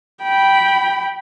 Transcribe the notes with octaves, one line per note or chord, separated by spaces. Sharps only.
G5 B5